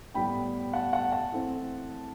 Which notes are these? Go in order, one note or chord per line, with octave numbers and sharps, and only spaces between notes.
A2 G3 B3 G5 B5
F#5 A5
F#5 A5
F#5 A5
E3 A3 C4